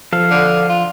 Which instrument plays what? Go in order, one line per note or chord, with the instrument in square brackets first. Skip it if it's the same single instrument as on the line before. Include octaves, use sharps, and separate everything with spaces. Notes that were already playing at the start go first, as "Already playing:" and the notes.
[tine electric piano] F3 [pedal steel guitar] A4 F5
[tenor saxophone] D3
F4